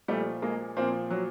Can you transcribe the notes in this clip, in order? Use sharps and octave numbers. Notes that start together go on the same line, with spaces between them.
A#2 F3 G3 A3
G#3 A#3
A#2 F3 A#3 C4
F#3